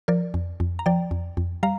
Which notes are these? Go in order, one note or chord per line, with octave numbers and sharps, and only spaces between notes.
F3 A#4 D5
F2
F2
A#5
F3 D5 G5
F2
F2
G3 F5 A#5